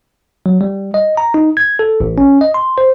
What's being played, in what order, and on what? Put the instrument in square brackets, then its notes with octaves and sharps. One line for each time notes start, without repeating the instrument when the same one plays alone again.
[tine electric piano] F#3
G3
D#5
A#5
D#4
G#6
A4
A1
C#4
D#5
C6
C5